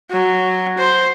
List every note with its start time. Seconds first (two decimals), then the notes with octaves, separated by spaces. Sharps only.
0.11 F#3
0.79 C5